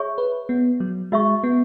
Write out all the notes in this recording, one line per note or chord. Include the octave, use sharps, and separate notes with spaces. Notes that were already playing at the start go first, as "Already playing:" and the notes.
Already playing: G#4 C#5 E5 C#6
B4
B3
F#3
G#3 F#4 E5 C#6
B3